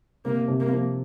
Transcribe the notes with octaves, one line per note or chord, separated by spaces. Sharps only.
C3 A#3
C3
A#3
F3